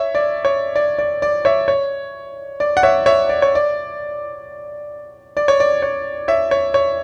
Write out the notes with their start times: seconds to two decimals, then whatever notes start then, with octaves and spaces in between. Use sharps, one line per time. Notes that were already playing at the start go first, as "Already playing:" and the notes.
Already playing: C#5 E5
0.15 D5
0.45 C#5
0.76 D5
0.99 D5
1.22 D5
1.45 C#5 E5
1.68 C#5
2.60 D5
2.77 F#5
2.83 C#5 E5
3.06 C#5 E5
3.29 D5
3.42 C#5
3.55 D5
5.37 D5
5.48 C#5
5.60 D5
5.82 C#5
6.28 C#5 E5
6.51 C#5
6.74 C#5